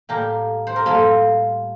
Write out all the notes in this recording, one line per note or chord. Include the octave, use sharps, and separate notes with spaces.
A2 G3 A#3 G4 A#4
C5
A#4
A2 G3 A#3 F4 A4